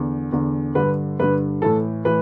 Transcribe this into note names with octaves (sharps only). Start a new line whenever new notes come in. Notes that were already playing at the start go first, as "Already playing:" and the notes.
Already playing: E2 D3
E2 D3
G2 D3 B4
G2 D3 B4
A2 E3 A4
A2 E3 B4